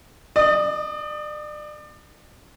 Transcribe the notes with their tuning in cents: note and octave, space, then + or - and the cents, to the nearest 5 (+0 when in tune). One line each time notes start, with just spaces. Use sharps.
D5 +35 D#6 +0